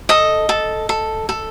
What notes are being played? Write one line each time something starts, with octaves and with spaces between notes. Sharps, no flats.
A4 D#5
A4
A4
A4